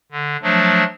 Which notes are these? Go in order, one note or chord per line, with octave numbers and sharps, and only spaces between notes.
D3
F3 F#3 A3 D4